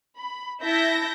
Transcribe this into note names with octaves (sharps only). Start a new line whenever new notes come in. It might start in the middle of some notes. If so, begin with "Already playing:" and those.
B5
E4 E5 A5 G6 A#6